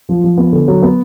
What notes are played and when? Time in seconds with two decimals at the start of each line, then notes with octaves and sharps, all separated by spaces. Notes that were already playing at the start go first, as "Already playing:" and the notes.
0.09 F3
0.24 F3
0.38 B3
0.53 D3
0.68 F#3
0.82 B3